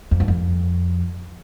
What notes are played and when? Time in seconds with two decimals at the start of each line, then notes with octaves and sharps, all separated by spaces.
0.11 F2
0.20 G2
0.28 F2